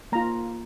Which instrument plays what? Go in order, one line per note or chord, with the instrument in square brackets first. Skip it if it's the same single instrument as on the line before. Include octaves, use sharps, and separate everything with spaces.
[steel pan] A#3 F4 A#5